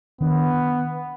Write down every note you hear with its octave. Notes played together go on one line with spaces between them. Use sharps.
D#3 B3 D4